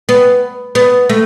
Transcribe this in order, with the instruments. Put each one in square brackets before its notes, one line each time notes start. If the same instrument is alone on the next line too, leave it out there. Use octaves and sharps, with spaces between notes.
[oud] B3
B3
A3